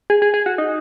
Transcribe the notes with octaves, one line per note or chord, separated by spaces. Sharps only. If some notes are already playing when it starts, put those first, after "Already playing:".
G#4
G#4
G#4
F#4
D#4